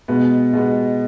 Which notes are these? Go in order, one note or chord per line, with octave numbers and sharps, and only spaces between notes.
B2 G#3 B3
B2 G#3 B3